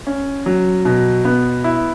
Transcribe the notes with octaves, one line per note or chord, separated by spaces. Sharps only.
C#4
F#3
B2
B3
E4